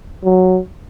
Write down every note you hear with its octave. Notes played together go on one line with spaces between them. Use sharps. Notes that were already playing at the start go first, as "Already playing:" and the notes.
F#3